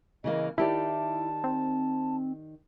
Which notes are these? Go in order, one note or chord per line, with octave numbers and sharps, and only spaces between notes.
C#3 E3 A#3 D#5
D#3 E4 G4 D5 A5
C4